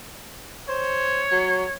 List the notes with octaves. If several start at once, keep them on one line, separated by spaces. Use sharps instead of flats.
C5 C#5
F#3